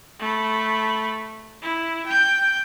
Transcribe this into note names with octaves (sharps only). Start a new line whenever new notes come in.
A3 B5
E4
G5 G6